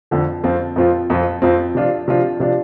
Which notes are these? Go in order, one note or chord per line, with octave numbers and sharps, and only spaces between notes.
F2 D3 F3
F2 F3 C4 F4
F2 F3 C4 F4
F2 F3 C4 F4
F2 F3 C4 F4
C3 F3 D4 F4
C3 F3 D4 F4
C3 F3 D4 F4